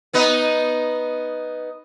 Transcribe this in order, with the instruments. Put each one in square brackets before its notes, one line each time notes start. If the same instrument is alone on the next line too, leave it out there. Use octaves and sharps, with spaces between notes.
[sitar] B3 D#4 B4